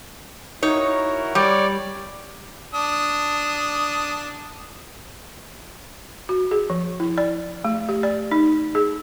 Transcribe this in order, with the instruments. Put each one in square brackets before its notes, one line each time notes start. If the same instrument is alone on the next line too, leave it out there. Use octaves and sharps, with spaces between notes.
[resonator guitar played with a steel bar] D#4 C#5 [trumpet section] E4 F#4 A#4
[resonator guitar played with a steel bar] G3 [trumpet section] C#5 D5
[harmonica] D4 D#6
[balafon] F#4
G#4
F3
E4
D5
A3
G4
D5
D#4
G#4